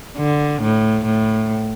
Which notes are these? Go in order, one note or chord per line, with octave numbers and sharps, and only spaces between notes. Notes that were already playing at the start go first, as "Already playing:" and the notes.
D3
A2
A2